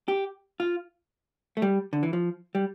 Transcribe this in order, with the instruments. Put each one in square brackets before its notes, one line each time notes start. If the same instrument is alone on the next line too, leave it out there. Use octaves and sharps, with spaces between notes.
[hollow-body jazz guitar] G4
F4
A3
G3
D3
E3
F3
G3